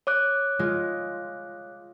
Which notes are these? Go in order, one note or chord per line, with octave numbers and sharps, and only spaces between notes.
C#5 D6 F#6
G#3 F4